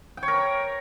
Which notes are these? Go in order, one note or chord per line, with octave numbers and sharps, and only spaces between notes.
G5
C#5
A#4